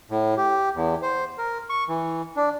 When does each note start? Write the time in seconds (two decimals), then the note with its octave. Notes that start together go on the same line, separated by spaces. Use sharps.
0.11 A2
0.37 G4
0.75 E2
1.02 C5
1.38 A#4
1.70 C#6
1.88 E3
2.36 D4